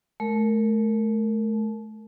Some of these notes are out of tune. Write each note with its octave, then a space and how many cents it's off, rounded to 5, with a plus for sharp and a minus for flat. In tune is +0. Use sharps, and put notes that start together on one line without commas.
A3 -30 A#4 -15